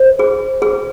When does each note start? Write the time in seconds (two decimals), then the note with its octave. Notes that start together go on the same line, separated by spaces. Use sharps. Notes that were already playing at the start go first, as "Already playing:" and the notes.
Already playing: C5
0.19 G#4
0.62 G#4